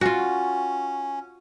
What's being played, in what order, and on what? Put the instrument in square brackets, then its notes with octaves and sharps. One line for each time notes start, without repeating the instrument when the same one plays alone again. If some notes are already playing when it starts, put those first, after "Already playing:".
[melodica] C#4 [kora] F4 F#4